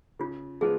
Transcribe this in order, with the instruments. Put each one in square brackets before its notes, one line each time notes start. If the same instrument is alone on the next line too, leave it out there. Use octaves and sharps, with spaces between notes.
[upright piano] C#3 [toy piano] F4
[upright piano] F3 G#3 B3 F4 [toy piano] G#4